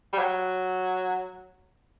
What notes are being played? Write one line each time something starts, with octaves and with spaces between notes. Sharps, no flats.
G3
F#3